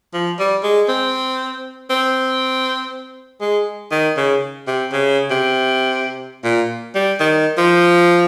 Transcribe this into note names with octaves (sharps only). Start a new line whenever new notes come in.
F3
G3
G#3
C4
C4
G#3
D#3
C#3
C3
C#3
C3
A#2
G3
D#3
F3